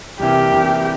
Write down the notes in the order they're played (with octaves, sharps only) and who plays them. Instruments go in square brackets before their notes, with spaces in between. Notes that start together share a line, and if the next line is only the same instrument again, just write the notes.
[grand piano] C2 C3 E3 A#3 [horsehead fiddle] G4
[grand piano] C2 C3 E3 A#3